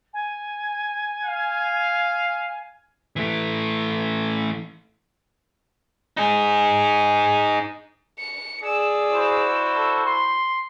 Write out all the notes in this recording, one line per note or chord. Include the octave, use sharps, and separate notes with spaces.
G#5
F5
E3 A3
D#4 G#4
C#7
G#4 D5 E6
E4 F#4 C5
A4
C6